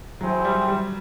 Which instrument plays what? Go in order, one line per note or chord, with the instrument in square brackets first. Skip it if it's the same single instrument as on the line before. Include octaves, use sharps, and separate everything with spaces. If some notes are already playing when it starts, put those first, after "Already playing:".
[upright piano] F#3 [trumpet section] E4 G#4 C5 E5 G5
[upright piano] G3
G3